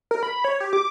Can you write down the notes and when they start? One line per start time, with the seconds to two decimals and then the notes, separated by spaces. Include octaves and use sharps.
0.11 A#4
0.23 B5
0.44 C#5
0.60 G4
0.73 D6